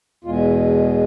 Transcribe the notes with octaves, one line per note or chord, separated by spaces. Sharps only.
E2 B2 G#3 F4